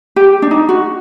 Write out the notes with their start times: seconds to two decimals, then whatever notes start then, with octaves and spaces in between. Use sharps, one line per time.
0.16 G4
0.42 D4
0.51 D#4
0.69 F#4